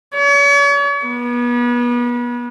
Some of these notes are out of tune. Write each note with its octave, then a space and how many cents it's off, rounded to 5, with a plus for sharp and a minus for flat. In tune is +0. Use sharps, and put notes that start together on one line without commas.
C#5 +40
B3 -35